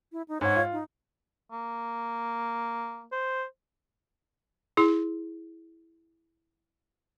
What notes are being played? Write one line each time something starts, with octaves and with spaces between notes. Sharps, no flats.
E4
D#4
G#2 C#5 F#5
F4
D#4
A#3
C5
E4 G#4